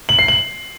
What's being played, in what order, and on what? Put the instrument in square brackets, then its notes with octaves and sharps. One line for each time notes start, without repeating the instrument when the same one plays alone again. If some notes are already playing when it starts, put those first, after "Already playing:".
[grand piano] F#7
C7
F#7